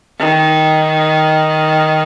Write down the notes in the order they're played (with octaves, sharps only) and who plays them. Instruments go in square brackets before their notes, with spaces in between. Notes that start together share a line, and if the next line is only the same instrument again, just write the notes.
[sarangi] D#3